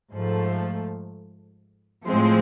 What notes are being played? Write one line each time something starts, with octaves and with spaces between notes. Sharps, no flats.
G#2 F3 A3
A2 F3 G#3 C4